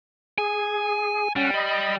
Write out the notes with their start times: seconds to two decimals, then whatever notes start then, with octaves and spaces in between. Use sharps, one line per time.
0.38 G#4 G#5
1.36 G3 C#4 F#5
1.54 D#5 B5